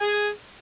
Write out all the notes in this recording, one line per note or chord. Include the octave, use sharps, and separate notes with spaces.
G#4 G#5